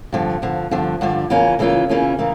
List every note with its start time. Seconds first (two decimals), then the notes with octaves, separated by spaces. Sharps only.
0.12 G2 D3 F3
0.42 G2 D3 F3
0.71 G2 D3 F3
1.01 G2 D3 F3
1.30 C#3 E3 A#3 C#4 F4
1.59 C#3 E3 A#3 C#4 F4
1.89 C#3 E3 A#3 C#4 F4
2.19 C#3 E3 A#3